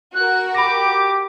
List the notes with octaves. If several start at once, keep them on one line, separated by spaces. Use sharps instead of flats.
F#4 A#4 F#6
G4 B5 D6 A#6